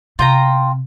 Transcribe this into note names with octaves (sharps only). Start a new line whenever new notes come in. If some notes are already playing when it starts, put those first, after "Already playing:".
C3 F4 G5 A#5